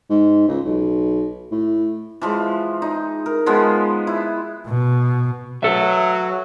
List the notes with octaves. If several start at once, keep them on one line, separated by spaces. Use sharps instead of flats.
G#2
C#2
B1
A2
E3 F3 G#3
D#4
A#4
F3 G#3 B3
E4
B2
F#3 A4 B4 E5